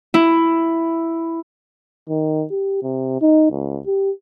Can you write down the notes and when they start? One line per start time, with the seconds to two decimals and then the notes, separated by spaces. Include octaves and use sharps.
0.14 E4
2.09 D#3
2.51 G4
2.83 C3
3.21 D#4
3.51 C#2
3.86 G4